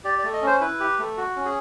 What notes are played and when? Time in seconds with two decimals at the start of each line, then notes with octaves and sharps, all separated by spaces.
0.04 G4 D5
0.19 D5
0.24 A3
0.33 D#5
0.42 C#4
0.47 C5
0.61 E4 B4
0.80 G4
0.99 A3
1.17 F#4
1.36 C#4
1.45 G#4